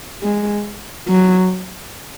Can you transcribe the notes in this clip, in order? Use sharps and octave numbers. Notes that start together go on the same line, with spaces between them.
G#3
F#3